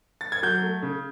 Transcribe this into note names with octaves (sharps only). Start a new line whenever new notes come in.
A6
G#6
F#3 G6
A3
C#3